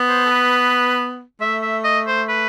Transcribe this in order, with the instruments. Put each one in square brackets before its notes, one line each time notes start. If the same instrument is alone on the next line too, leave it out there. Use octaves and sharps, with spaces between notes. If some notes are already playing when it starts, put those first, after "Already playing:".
Already playing: [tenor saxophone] B3
[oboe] C5
A4
B4
[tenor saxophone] A3 [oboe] E5
[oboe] E5
D#5
C5
B4